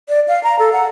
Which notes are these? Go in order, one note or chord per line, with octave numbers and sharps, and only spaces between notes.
D5
F5
A#5
A4
F#5